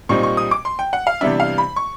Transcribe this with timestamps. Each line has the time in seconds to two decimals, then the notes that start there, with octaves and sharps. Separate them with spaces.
0.09 A#2 G3 C4 D#4 C#6
0.23 C#6
0.37 D#6
0.51 D6
0.65 C6
0.79 G5
0.93 F#5
1.07 F5
1.21 C3 E3 G3 B3 D4 E5
1.40 F5
1.58 B5
1.76 C#6